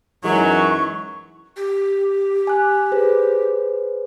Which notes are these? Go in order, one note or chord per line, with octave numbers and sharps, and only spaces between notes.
F#2 E3 F#3 G#3 D#4 C#6
G4
G#5 F#6
G#4 B4 C5